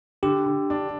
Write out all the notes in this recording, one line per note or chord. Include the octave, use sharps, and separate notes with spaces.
D3 G4
D3
D4